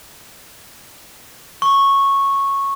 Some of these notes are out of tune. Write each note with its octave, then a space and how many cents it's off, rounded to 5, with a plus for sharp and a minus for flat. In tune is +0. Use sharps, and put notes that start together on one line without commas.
C#6 -10